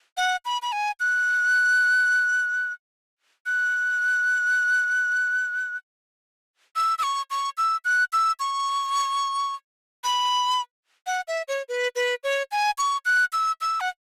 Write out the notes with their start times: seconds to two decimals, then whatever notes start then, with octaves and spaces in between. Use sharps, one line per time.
0.17 F#5
0.45 B5
0.62 B5
0.72 G#5
1.00 F#6
3.46 F#6
6.76 E6
6.98 E6
7.03 C#6
7.31 C#6
7.58 E6
7.85 F#6
8.13 E6
8.40 C#6
10.04 B5
11.07 F#5
11.28 E5
11.48 C#5
11.69 B4
11.96 B4
12.24 C#5
12.52 G#5
12.78 C#6
13.05 F#6
13.33 E6
13.61 E6
13.80 F#5